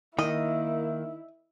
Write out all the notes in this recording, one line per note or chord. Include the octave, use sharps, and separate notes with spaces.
D#3 A#3 E4 D#5